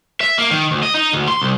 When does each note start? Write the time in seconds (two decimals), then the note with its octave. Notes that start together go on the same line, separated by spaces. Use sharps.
0.21 E5
0.38 A#3
0.51 D#3
0.71 D2
0.83 D#5
0.94 D#4
1.13 D2
1.28 C6
1.41 C2